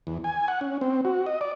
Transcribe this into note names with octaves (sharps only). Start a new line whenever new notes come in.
E2
G#5
F#5
C#4
C4
F#4
D#5
D5